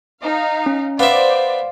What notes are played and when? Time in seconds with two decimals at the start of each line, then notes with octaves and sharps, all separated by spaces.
0.22 D#4 F5
0.66 C#4
0.99 B3 C5 D5 E5 F5